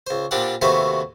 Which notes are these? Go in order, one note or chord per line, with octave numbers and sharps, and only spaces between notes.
C#2 C5
A#2 G3 C4 D4 D5 F#5
D#2 C3 A3 F#4 B4 C5